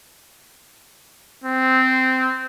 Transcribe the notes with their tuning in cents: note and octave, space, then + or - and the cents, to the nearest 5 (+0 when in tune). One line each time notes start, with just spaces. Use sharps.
C4 -10